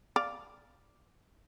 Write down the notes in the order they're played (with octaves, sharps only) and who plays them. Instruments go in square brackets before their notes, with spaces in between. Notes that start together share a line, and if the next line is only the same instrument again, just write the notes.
[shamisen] D5 F5